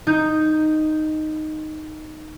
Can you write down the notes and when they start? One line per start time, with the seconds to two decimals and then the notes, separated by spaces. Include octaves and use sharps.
0.07 D#4 G6